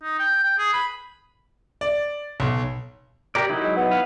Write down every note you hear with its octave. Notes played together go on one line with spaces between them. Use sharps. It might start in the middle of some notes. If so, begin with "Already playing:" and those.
D#4
G5
G5
G#4
B5
D5
B1
G4 A#4 D5
F#3 D#4 E4
G#3
B3
B4 F5